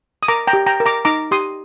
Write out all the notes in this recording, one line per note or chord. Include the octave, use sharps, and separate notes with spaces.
D#6
A#4 A#5 D6
G5 A#5
G4
G5 A#5
A#4
A#5 D6
D#4 A#5 D6
G4 C6 D#6